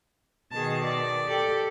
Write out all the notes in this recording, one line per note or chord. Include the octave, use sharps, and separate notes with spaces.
B2 D#3 G#4 A5
D5
G4 A4